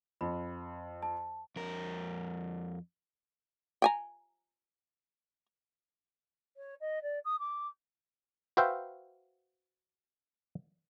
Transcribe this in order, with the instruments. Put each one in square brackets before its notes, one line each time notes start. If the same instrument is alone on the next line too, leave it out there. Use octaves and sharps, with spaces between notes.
[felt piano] F2 [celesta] B5
[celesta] A5
[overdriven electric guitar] F2 A#4
[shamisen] G5 G#5 A#5
[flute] C#5
D#5
D5
D#6
D6
[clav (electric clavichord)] F#4 B4 C5 E5 F5 G5